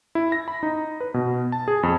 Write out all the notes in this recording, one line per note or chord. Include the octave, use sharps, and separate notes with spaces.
E4
A#6
B5
D#4
B4
B2
A5
G#4
F2